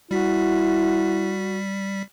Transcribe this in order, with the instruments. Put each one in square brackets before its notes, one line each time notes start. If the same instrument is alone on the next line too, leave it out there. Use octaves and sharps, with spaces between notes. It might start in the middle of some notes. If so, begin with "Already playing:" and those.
[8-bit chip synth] G3 B6 [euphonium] E4 [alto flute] F#4